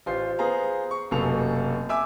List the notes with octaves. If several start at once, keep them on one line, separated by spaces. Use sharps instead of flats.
A1 F4 C5 C7
B3 G#4 C5 F5 A#5
C#6
F1 F#2 B2 A#3 A4 F7
E5 G#5 D6 E6